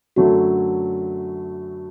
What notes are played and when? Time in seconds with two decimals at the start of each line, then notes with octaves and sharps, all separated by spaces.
0.16 F#2 D3 F#3 A3 C#4 F#4